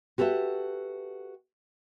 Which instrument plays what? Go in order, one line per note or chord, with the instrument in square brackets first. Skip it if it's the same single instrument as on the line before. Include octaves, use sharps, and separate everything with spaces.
[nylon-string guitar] F#4 G4 A4 B4 E5